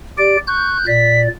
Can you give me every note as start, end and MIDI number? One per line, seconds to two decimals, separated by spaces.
0.18 0.37 67
0.18 0.37 74
0.18 0.39 98
0.47 0.78 85
0.47 0.86 90
0.47 0.86 91
0.87 1.28 46
0.87 1.28 74
0.87 1.21 95